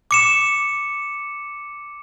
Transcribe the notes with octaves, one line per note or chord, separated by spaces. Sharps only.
D6 C#7 E7